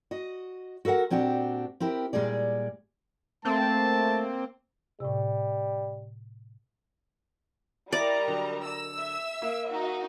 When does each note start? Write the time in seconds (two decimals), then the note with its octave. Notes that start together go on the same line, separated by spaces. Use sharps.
0.11 F#4 D#5
0.85 F#4 A4 A#4 F5 F#5
1.10 A#2 C4 D4 F#4 G4
1.80 C4 E4 G4 A#4
2.13 A#2 G3 G#3 G#4 D5
3.45 A3 A#3 C4 A5
5.00 A2 C3 G3
7.92 G3 E4 A#4 D5 D#5 A#5
8.27 D3 F#3
8.64 E6
8.98 E5
9.42 A#3 E7
9.70 D#4 F#4